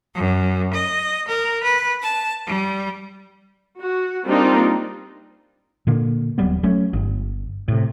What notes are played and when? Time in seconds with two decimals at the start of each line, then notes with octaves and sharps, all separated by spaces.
0.15 F#2
0.73 D#5
1.29 A#4
1.64 B4
2.02 A5
2.47 G3
3.79 F#4
4.25 G3 A#3 C4 D4 D#4 F4
5.87 A#2 D3 A#3
6.38 D#1 F#3 G3 B3
6.63 F#3 A3 C#4
6.93 G1
7.68 A2 C3